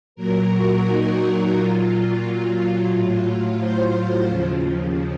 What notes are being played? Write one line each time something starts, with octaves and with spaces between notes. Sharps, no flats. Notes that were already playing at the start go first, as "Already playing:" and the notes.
A#2 F#3 A#4
F#4
D#4
A#2 F#3 F4
A2 F#3 F4
F4
C5
C5
D#2 C#3 F3